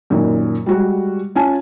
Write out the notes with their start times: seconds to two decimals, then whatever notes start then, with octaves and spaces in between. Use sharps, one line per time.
0.10 F#2 A#2 D#3
0.66 G3 G#3 F#4
1.35 C#4 F4 G#5 A5